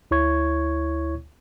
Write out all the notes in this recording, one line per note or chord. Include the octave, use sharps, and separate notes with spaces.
D2 E4 C#5 C#6 G#6